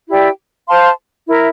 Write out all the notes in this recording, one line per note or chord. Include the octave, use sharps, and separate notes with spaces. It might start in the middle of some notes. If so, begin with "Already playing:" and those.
E4 G4 D5 G5
C5 F5 A5 C6
E4 A#4 E5